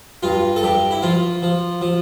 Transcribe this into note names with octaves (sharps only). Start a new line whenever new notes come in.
G2 F4
A4
G2 G4
E4
F3 F4
F3
F3